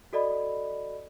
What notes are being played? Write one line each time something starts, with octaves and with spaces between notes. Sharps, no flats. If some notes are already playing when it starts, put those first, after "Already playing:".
F#4 A4 D5 D#5 B5